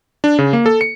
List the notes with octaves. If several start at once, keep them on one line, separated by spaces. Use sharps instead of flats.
D4
C#3
A#3
A4
C#7